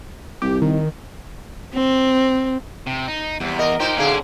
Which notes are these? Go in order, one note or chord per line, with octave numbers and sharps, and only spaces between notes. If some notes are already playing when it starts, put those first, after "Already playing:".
C2 G4
D#3
C4
C3
D#4
E2 C3 G3
A#4 D#5
D#4 F4 G4 A#4 C5
B2 D3 C#4 G#4 D5 F5